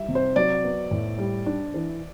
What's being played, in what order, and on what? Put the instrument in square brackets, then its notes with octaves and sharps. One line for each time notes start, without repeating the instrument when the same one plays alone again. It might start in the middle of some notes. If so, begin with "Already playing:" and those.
Already playing: [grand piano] G3 [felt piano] E5
[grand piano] C3
[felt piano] C5
[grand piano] F#3 [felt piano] D5
[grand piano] B3
A2
G3
D4
E3